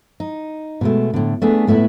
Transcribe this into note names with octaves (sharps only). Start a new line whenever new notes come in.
D#4
B2 G#3 A3
A2 D3
A3 B3 D4 G#4
A2 A3 B3 E4 B4